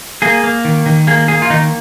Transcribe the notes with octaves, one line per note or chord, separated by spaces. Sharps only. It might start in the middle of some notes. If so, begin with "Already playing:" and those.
A#3 G#4
A#3
D#3
D#3
A#3 G#4
A#3 G#4
F4
D#3 D#4